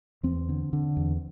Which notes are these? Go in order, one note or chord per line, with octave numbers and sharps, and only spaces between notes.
E2 C4
D3
D3
E2